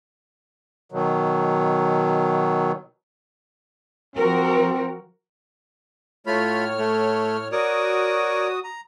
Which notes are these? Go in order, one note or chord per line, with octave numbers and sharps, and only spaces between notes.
B2 D#3 F#3
F3 C4 F#4 A#4
A2 A3 F4 C#5 B5 F6
A3
F#4 A#4 C#5 D5 D#6
A#5